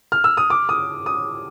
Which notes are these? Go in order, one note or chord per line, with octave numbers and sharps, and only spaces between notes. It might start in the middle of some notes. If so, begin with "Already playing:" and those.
F6
E6
D#6
D6
D#6
D#6